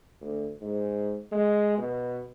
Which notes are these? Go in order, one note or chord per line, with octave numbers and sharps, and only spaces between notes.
D2
G#2
G#3
B2